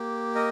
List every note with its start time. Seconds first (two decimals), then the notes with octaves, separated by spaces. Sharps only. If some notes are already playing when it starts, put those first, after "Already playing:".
Already playing: A#3 G4
0.35 A#4 D#5